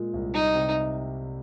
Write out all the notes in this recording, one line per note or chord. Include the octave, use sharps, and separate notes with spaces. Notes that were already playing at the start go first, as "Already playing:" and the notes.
Already playing: A#2 G#3
C2
G3 D#4
C3